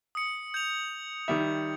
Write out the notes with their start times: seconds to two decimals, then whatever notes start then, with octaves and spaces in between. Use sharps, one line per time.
0.15 D#6 C#7
0.54 G6 F7
1.28 D#3 G3 E5 F7